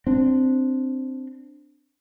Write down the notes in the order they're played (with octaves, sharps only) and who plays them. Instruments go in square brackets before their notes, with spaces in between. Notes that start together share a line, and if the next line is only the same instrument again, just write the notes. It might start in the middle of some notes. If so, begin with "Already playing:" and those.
[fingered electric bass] C4 D4